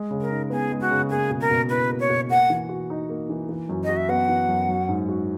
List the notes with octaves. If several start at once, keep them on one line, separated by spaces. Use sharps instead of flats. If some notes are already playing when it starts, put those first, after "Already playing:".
Already playing: G#3
C#3
A#4
D#4
B3 G#4
G#3
F#4
C#3
A#3 G#4
B2
A#4
B2
E4 B4
A#3
C#5
B2
A#3 F#5
E3
F#4
D#4
A#3
E3
E3
F#2
D#5
F#4
E5
B3 F#5
E3
F#2
F#3
G#2
F#4